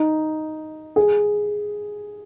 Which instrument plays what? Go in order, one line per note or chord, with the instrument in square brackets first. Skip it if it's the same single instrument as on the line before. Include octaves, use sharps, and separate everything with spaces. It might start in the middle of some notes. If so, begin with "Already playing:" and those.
Already playing: [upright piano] D#4
G#4